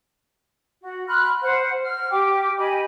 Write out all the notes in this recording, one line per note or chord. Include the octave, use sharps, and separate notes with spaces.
F#4
B5 C6 F6 F#6
C5 F#5
F6
G4 G5 D6
G4 D#5 G#5 B5